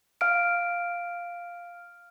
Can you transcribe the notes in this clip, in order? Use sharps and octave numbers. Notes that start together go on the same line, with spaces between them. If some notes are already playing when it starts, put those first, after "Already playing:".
F5 F6 D7